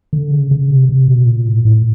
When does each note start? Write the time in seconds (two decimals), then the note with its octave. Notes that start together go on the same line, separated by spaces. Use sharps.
0.13 D3
0.31 C#3
0.51 C#3
0.70 C3
0.89 C3
1.08 B2
1.27 A#2
1.47 A2
1.65 A2